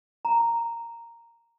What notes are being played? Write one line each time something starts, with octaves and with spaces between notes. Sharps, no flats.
A#5